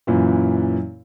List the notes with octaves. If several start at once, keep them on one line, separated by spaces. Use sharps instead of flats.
F#2 A#2 E3